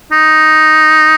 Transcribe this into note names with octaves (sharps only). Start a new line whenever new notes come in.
D#4